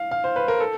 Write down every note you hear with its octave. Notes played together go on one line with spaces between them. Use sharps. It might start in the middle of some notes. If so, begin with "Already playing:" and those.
Already playing: F5
F5
C5
B4
A#4
A4